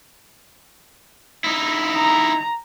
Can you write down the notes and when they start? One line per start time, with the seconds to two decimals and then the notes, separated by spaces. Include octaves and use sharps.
1.44 D#4 E4
1.93 A#5